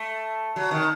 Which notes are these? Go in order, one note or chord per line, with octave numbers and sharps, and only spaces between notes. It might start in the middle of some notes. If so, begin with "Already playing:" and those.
Already playing: A3
F#3
D#3